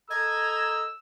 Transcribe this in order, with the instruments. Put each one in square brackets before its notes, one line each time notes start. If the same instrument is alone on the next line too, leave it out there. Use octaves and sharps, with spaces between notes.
[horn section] A4 D#5 A#5 [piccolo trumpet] E6 [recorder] G#6